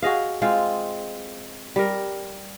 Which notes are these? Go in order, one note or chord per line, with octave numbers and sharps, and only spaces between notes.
F#4 G#4 D#5 F5
G#3 C4 F4 F5
G3 A#4